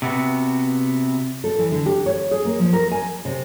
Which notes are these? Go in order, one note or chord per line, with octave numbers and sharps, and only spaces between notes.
C3 B3 F#4
A4
E3
D3
G4
C#5
G#4
A#3
F3
A#4
G#5
C3